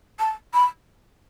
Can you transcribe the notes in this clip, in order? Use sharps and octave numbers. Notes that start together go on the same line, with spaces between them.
A5
B5